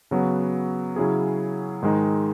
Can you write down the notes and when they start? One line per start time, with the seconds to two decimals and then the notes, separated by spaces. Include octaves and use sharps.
0.11 C#3 F#3 B3 F#4
0.96 C#3 F#3 C#4 E4 G#4
1.82 G#2 D#3 G#3 D#4